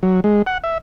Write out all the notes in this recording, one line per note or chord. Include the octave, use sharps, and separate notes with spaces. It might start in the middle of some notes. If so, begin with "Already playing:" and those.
F#3
G#3
F#5
E5